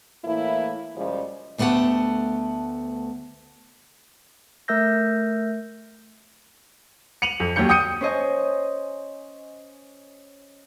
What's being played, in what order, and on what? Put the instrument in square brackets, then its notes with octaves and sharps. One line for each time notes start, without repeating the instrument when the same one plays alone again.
[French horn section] A2 E3 A#3 E4
F#2 C#3 F3 G3 G#3
[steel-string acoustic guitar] D2 A3 B3 G4 F#5 A5
[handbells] A3 A#4 E5 E6 G6 A#6
[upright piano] C#7 D#7 F7 F#7
F2
D#2 F#3 G4 G6 C#7
G5 D#6 G6 C#7 D#7
[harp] C#4 C5 D#5 G#5